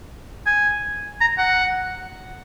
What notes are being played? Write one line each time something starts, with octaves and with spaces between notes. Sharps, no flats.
G#5
A#5
F#5